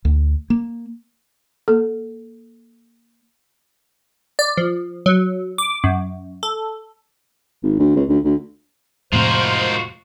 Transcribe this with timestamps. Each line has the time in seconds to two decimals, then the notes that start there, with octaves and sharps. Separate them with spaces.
0.05 D2
0.50 A#3
1.68 A#3 A4
4.39 D5
4.57 F3
5.06 F#3
5.58 D6
5.84 F#2
6.43 A4
7.63 G#1
7.79 D2
7.96 C#2
8.09 D2
8.24 D2
9.13 F2 A2 C3 G#3 F4 F#4 A#4 C5